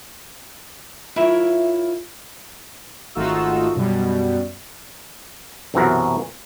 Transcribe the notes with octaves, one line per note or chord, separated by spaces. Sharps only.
E4 F4 A#4 C#5 E5
G#1 A3 D#4 F4 F#4 E6
F#2 B2 G3
B1 F#2 C3 E3 F#4 A#4